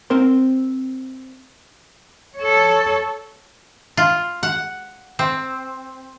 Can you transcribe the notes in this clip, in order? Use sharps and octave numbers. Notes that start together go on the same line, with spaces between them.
C4 A#4 C5 C6
A4 C#5
F4
F#5
C4